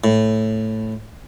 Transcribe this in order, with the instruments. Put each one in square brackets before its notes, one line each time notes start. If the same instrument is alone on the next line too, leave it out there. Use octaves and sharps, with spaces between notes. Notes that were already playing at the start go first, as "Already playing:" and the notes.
[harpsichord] A2